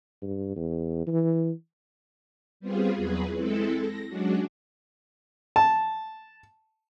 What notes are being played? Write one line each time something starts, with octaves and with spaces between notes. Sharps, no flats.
G2
E2
E3
G3 B3 C4 F4 G#4
E2 F#3 G#4 B4
G#3 C4 E4 A4
A#6
F#3 G#3 C#4 D4 F#4
A5